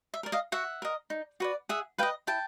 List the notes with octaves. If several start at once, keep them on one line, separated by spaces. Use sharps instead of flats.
E5
A#4 D5
D#5 F5
F#4 E5 F#5
A#4 D#5
D#4
F#4 B4 D5
G#4 E5 F#5
B4 D#5 F5 G5
E4 G5 A5